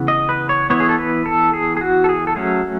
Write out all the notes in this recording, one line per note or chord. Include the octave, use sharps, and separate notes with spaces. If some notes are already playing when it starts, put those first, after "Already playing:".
Already playing: C#3 E3 B3
D#5
B4
C#5
E3 B3 C#5
G#4
A4
B4
A4
G#4
G#4
F#4
A4
G#4
A4
F#3 A3 C#4 G#4